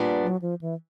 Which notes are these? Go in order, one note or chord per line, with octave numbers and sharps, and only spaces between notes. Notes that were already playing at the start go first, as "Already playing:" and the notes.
Already playing: A#2 G3 B3 D4
F#3
F3
E3